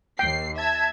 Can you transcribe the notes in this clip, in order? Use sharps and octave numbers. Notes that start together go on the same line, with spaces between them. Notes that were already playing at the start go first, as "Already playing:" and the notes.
D#2 G5 C7
E5 A5 G#6